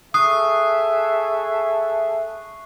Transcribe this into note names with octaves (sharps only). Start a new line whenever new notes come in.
G#4 A4 E5 C#6 D#6 F#6 C7